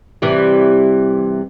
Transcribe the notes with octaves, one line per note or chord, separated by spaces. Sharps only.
C3 E3 G3